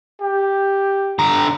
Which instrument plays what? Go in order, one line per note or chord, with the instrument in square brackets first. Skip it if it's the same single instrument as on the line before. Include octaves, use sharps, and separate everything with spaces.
[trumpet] G4
[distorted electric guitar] D3 A#5